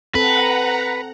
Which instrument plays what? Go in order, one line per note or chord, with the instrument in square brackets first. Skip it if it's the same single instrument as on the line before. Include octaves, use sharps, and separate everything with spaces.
[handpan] C4 A4 [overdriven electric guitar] B4 [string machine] F#5 A#5